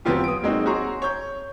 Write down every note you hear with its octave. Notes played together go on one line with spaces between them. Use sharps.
F2 F#3 B3 C4 F4 G4
D#6 D7
F#3 G#3 A#3 C4 D#4 F#4
C4 F#4 G#4 C#5 A#5 C6
C#5 G6